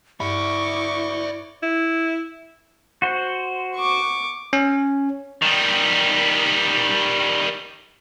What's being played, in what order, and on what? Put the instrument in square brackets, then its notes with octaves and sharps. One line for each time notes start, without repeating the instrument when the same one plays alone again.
[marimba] G2 [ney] E4 [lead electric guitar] D5 E5 [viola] C#6 D6
[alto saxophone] E4
[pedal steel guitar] F#4 C5
[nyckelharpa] C#6 D6
[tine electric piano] C#4
[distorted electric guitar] D#3 G3